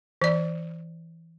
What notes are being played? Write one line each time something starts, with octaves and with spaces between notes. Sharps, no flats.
E3 D5